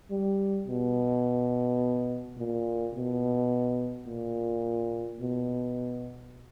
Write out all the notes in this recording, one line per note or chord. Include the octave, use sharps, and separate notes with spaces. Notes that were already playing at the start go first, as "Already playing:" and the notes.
G3
B2
A#2
B2
A#2
B2